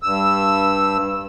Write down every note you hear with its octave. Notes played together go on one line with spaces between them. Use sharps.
G2 E6